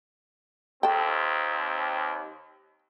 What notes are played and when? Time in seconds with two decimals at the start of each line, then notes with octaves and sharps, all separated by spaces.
0.83 D#2 C4 A4 G5